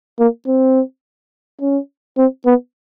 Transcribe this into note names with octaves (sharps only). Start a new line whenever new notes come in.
A#3
C4
C#4
C4
B3